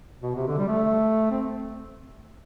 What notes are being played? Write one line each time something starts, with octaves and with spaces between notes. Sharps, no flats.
B2
C3
D3
G3
A3
C4